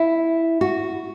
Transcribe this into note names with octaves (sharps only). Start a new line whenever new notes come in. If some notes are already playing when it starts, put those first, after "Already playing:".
Already playing: E4
F#4